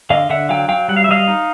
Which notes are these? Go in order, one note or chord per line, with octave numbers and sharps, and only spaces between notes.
D3 D#5 F5
D3 E5 F#5
F#3 F5 G5
F#3 F5 G5
G3 F#5
F5
E5
G3 D#5 F5
D#4